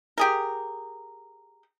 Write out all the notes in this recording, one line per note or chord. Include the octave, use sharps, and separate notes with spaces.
G4 G#4 A#4